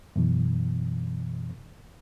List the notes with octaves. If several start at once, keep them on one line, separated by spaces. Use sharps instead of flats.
F#2 B2 E3